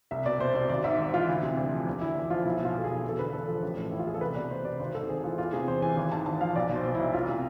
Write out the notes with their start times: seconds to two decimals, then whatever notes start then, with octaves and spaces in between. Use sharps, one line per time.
0.11 C2 E5
0.26 B2 D5
0.40 B2 C5
0.54 C2 D5
0.69 G#1 D5
0.84 G#2 E5
0.98 G#1
1.14 E3 F4
1.28 D2 E4
1.43 C3
1.57 D2
1.73 F3
1.87 E2
2.01 D3 E4
2.17 E2
2.30 F3 F4
2.45 B1 E4
2.59 B2
2.65 F4
2.75 B2 A4
2.84 G#4
2.90 B1
3.04 E2 A4
3.18 D3 B4
3.33 E2 A4
3.48 F3 A4
3.62 A1
3.77 A2
3.92 A1 E4
3.99 F4
4.07 E3 G#4
4.14 A4
4.21 C2 B4
4.36 B2 D5
4.50 B2 C5
4.65 C2 D5
4.79 G#1 C5
4.94 G#2 A4
5.09 G#1 G#4
5.24 E3 F4
5.38 E2 F4
5.53 C3 G#4
5.67 E2 C5
5.82 E3 G#5
5.97 G#1
6.12 G#2 A5
6.26 G#1 A5
6.40 F3 F5
6.56 B1 D5
6.70 B2
6.75 C5
6.84 B2
6.95 B1 E4
7.14 C2 F4
7.29 C3